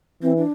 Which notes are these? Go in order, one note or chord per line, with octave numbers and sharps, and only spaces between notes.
E3 C4
D4